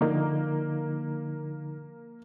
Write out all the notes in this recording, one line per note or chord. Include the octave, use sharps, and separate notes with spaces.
D3 F3 A#3 D#4